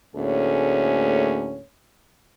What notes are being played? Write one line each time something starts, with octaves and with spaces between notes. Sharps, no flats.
D2 A2 A#3 C#4 G#4 C#5